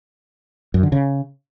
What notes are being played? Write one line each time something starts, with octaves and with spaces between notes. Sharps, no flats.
F#2
D3
C#3